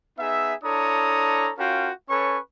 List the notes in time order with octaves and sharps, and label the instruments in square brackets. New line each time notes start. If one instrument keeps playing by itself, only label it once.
[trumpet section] B3 D#4 G#4 E5
D4 E4 A4 C#5 A#5 D#6
C#4 F4 F#4 A#4 F5 G5
C#4 A4 B4 C#5 G#5 C#6